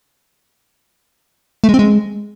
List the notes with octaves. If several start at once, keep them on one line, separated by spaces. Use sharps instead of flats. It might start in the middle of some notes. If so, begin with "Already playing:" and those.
A3
G#3
C4
G#3